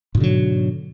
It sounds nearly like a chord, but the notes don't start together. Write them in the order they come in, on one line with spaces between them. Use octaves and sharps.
G#2 B2 D3 F#3